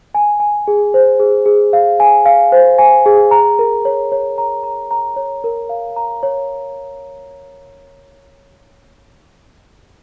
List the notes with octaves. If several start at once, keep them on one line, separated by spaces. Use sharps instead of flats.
G#5
G#5
G#4
C5
G#4
G#4
F5
G#5
F5
C5
G#5
G#4
A#5
A#4
C#5
C#5
A#5
A#5
A#5
C#5
A#4
F5
A#5
C#5